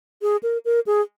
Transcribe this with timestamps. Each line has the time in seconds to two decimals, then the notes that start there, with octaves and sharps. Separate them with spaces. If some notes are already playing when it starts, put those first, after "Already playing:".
0.22 G#4
0.43 A#4
0.65 A#4
0.87 G#4